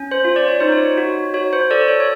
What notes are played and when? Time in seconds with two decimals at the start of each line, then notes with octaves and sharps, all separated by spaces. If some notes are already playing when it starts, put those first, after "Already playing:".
Already playing: C#4
0.11 C5
0.25 F4
0.36 D5
0.48 C#5
0.60 D#4 C5
0.72 C#5
0.97 F#4
1.34 F#4 C#5
1.53 C5
1.71 A4 D5
1.88 C#5
2.00 C#5